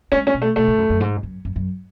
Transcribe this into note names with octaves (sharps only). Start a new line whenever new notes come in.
G#3 C#4
C#4
B2
A3
B2 A3
A2
F#2
F#2
G#2
F#2
F#2
F#2